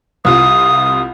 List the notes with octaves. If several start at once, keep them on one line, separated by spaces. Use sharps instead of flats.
C2 C3 F4 D#6